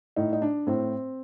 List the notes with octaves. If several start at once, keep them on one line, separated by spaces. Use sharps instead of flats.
A2 D#4
D#4
D4
A2 C4